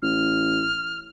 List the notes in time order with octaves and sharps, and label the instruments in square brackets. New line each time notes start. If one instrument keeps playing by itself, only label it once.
[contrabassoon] A1 [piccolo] F6